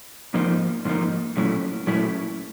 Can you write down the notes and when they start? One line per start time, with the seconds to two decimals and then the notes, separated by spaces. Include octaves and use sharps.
0.34 G#2 F3 A#3 D#4
0.85 G#2 F3 A#3 D#4
1.37 A#2 F#3 A3 C#4 E4
1.87 A#2 F#3 A3 C#4 E4